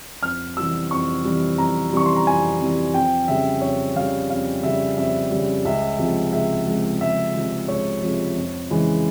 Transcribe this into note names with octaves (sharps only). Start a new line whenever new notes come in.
F2 F6
C3 E3 G3 E6
F2 C#6
C3 E3 G3
F2 A#5
C3 E3 G3 C#6
C6
A#5
F2 G#5
C3 E3 G3
F2 G5
C#3 G3 E5
F2 C#5
C#3 G3 F5
F2 F5
C#3 G3 E5
F2 E5
G3
C#3
C#2 E5
C3 F3 G#3
C#2 E5
C3 F3 G#3
C#2 E5
C3 F3 G#3
C#2 C#5
C3 F3 G#3
F2
C#3 E3 G#3